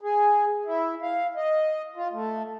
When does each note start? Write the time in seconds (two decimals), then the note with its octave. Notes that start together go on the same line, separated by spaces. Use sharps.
0.01 G#4
0.65 E4
1.02 F5
1.36 D#5
1.96 F4
2.13 A3